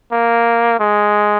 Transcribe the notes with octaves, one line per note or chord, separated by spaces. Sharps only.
A#3
G#3